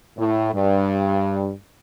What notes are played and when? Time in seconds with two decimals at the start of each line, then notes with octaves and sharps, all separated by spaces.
0.18 A2
0.53 G2